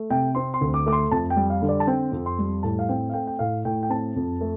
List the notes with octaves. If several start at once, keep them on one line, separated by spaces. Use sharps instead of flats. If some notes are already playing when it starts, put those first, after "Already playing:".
Already playing: A3
C3 G5
C4 C6
C6
D2
D6
A3 D6
C6
F2 A5
G5
G3
F5
D3
D5
A5
C4 G5
F2
C6
G3
A2 A5
F5
C4 G5
F5
A3 G5
G5
A2 F5
A2 G5
G5
C4 A5
F2
A3